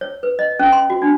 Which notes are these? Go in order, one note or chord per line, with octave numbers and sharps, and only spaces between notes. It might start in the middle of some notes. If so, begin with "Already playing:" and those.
C#5
B4
D#5
C#4
C6
F#4
D4